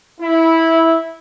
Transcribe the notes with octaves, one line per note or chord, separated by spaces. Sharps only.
E4